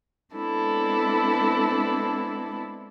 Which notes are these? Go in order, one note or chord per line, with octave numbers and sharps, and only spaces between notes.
G#3 B3 C4 D4 E4 A4